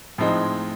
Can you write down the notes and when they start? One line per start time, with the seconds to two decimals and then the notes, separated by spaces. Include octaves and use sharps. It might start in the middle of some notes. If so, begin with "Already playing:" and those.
0.18 A2 F3 G#3 C4 D#4